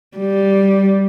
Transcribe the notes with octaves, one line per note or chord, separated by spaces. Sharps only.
G3